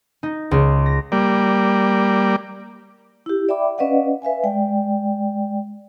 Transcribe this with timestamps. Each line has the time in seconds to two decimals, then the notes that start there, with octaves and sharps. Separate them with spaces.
0.23 D#4
0.51 C#2
0.86 A#6
1.12 G3 A#3 D5
3.26 E4 G4
3.49 D5 E5 G5 B5 D6
3.78 C#4 B4 D5 D#5 F5 F#5
4.22 B4 E5 F5 G#5
4.43 G#3 D5 G5